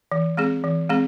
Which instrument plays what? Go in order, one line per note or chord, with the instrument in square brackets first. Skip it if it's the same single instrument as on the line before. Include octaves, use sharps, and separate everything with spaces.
[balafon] E3
G#3 C4 G#4
E3
G#3 C4 G#4